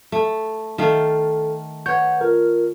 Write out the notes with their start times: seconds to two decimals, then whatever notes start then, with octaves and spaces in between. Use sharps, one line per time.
0.12 A3
0.78 D#3 A3 A4 F5
1.86 B4 C#5 F#5 G6
2.21 F4 A#4